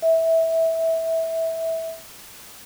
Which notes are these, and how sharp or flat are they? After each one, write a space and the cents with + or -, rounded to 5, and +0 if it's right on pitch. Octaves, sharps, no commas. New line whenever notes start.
E5 -15